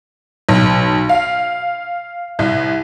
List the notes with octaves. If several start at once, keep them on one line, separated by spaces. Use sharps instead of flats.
B1
F5
C2